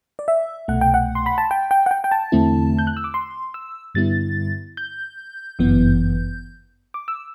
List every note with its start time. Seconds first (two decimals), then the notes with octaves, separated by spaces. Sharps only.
0.19 D5
0.28 E5
0.68 C2 B2 A3 F#5
0.81 G5
0.94 F#5
1.15 C6
1.26 B5
1.38 A5
1.51 G5
1.71 G5
1.86 F#5
1.91 G5
2.04 G5
2.11 A5
2.32 E2 D3 A3 C4 E4
2.79 G6
2.87 F#6
2.97 E6
3.04 D6
3.14 C6
3.54 E6
3.95 G2 D3 G3 B3 E4 A6
4.77 G6
5.59 G1 F#2 E3 B3
6.94 D6
7.08 E6